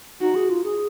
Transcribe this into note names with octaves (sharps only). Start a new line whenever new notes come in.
D#4 F#4
G#4
F4
G#4